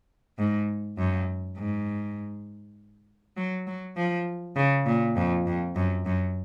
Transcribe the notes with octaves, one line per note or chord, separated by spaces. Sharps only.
G#2
F#2
G#2
F#3
F#3
F3
C#3
A#2
F2
F2
F#2
F#2